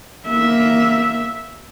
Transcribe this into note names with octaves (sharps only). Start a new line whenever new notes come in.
A#3 E5